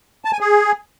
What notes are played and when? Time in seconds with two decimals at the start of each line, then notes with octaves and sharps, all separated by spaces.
0.25 A5
0.33 G#5
0.40 G#4